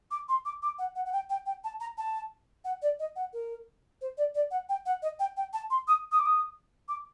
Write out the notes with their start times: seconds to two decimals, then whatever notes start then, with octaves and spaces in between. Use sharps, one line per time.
0.11 D6
0.28 C6
0.45 D6
0.62 D6
0.78 F#5
0.96 F#5
1.06 F#5
1.12 G5
1.30 G5
1.46 G5
1.64 A5
1.80 A#5
1.98 A5
2.64 F#5
2.82 D5
2.99 D#5
3.16 F#5
3.33 A#4
4.01 C5
4.17 D5
4.35 D5
4.51 F#5
4.69 G5
4.86 F#5
5.02 D#5
5.19 G5
5.37 G5
5.53 A5
5.70 C6
5.87 D#6
6.12 D#6
6.19 D6
6.26 D#6
6.88 D6